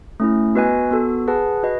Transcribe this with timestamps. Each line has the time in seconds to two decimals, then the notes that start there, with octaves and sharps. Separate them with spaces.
0.20 A3 C#4 E4
0.55 B3 F#4 B4 D#5 G#5
0.91 B3 F#4 A4
1.28 G#4 B4 F#5 A5
1.63 F#4 B4 D#5